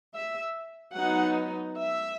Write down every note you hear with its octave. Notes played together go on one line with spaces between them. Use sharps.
E5
F#3 B3 D#4 F#5
E5